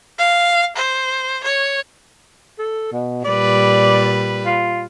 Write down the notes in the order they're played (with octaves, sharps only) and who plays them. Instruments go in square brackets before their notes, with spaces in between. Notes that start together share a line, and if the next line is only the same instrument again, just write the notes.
[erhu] F5
C5
C#5
[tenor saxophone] A4
B2
[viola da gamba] A#2 G3 B4 [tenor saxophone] D5
[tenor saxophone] F4